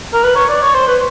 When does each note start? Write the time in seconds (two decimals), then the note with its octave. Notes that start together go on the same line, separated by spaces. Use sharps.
0.13 A#4
0.23 B4
0.36 C#5
0.49 D5
0.62 C#5
0.74 C5
0.87 B4